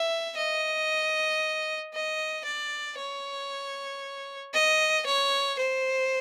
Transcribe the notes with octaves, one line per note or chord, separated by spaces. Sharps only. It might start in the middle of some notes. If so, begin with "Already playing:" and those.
Already playing: E5
D#5
D#5
D5
C#5
D#5
C#5
C5